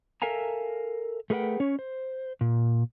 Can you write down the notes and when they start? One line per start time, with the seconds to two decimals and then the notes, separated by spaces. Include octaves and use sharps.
0.22 A4 A#4 E5 F5 G#5 A#5
1.30 A3 G#4 A#4 B4 F#5 G5
1.60 C#4 C#5
1.79 C5
2.41 A#2